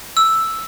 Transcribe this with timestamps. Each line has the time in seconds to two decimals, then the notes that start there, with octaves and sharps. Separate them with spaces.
0.17 E6